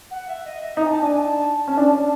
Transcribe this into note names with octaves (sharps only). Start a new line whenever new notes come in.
F#5
E5
D#5
E5
D#4 A#5
G#5
A5
D4 G#5
A5
C#4
D4